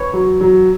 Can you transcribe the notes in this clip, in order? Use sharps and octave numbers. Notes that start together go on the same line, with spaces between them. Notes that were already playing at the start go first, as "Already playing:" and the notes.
Already playing: B4 C#5
F#3
F#3